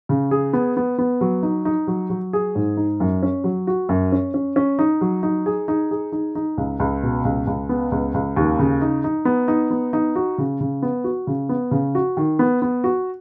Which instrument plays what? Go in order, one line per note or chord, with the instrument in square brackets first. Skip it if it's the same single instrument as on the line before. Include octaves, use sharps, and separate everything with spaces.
[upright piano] C#3
G#4
B3
B3
B3
F#3
D#4
D#4
F#3
F#3
G#4
G#2
D#4
F#2
C#4
F#3
F#4
F#2
C#4
C#4
C#4
D#4
F#3
D#4
G#4
D#4
G#4
D#4
D#4
C#2
C#2
B2
C#2
C#2
B3
C#2
C#2
D#2
C#3
D#4
D#4
B3
D#4
B3
D#4
F#4
C#3
C#3
B3
F#4
C#3
B3
C#3
F#4
D#3
B3
B3
F#4